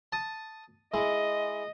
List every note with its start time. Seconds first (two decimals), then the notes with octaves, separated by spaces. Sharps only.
0.12 A5 D#6
0.94 G#3 E4 D#5